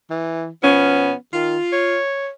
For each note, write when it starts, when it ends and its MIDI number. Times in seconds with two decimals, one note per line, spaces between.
0.10 0.49 52
0.63 1.13 47
0.63 1.13 53
0.63 1.15 59
0.63 1.13 61
1.34 1.57 51
1.34 1.97 65
1.73 2.30 73